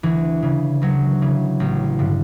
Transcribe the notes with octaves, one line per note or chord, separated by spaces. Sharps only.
D2 E3
C#3 E3
D2 F#3
C#3 E3
A1
G2 D3